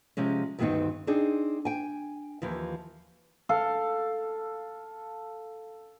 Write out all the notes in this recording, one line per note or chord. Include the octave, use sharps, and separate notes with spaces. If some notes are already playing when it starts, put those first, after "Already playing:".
C3 F3 G#3 C#4
D2 G2 D#3 B3 C4 D#4
C4 D4 D#4 G#4
G5 G#5
D#2 E3 F3
A4 F5